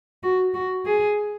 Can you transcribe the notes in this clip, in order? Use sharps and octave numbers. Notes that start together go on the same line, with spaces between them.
F#4
F#4
G#4